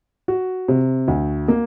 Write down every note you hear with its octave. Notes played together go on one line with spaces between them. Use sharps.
F#4
C3
D2
A#3